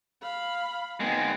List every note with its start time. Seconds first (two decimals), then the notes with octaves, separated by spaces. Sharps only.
0.22 F5 B5
1.00 G#3 B3 C4 D#4